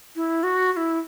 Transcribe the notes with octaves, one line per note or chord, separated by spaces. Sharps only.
E4
F#4
F#4
E4